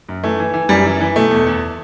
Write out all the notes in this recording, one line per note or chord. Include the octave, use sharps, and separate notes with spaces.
F#2
E3 A3
E3
E3
F#2 G3
E3
E3
B2 A3
E2
E2